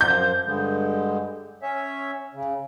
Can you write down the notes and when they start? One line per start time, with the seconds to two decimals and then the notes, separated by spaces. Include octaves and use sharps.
0.01 F#2 F3 C5 G6
0.45 G2 D3 G#3
1.62 C#4 C#5 E5
2.34 C#3